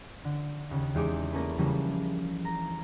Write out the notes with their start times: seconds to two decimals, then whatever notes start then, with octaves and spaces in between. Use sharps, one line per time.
0.25 D3
0.70 D#2 C#3
0.95 E2 G#3 D#4 G4 D6
1.32 A#3 B3 C#4 A4 B4
1.58 C#3 E3 F3 G3 G#3 A#3
2.45 A#5